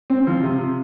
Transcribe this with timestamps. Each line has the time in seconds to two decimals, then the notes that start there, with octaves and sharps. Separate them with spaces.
0.10 C4
0.27 F3
0.43 C3